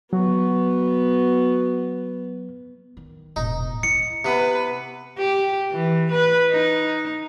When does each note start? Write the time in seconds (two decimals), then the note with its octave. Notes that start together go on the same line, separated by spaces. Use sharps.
0.13 F#3 B3 F#4
2.97 D#3
3.36 E1 A2 D#4
3.83 E4 C#7
4.25 C3 B3 B4
5.18 G4
5.72 E3
6.11 B4
6.51 D#4